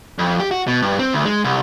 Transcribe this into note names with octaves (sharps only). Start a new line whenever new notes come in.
F2
G4
F#4
B2
G2
C4
D2
G#3
C2